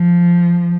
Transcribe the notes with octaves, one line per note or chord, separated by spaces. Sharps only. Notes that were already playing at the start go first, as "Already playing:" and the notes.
Already playing: F3